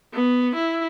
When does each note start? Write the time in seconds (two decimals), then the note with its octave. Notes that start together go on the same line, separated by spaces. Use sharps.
0.14 B3
0.56 E4